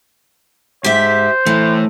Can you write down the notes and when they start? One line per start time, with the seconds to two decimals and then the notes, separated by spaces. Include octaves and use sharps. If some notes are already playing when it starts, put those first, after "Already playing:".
0.84 G#2 G4 C5 E5
1.46 E3 A3 E4